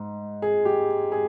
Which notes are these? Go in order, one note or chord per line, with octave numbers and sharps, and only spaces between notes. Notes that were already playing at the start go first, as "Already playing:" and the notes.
Already playing: G#2
G#4
G4
G#4